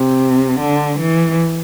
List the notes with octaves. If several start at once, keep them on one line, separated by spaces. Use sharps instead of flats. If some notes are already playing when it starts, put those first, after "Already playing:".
Already playing: C3
D3
E3